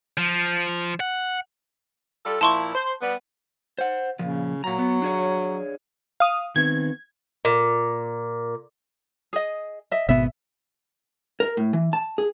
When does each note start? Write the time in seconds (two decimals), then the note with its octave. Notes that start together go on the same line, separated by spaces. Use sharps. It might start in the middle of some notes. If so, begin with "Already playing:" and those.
0.17 F3
1.00 F#5
2.25 G3 F4 A4
2.41 A#2 F3 E4 A5 C6 C#6
2.74 C5
3.02 G3 B3
3.79 C5 F#5
4.19 A#2 C#3 F3
4.64 A#2 F#3 A#5
4.78 B3
5.02 D4 G#4 C#5
6.20 F5 D#6
6.56 D#3 B3 C4 G#6
7.45 A#2
9.33 G#4 D#5
9.91 D#5 E5
10.09 G#1 B2 B3 E5
11.40 A#4
11.57 A2
11.73 E3
11.93 A5
12.18 G#4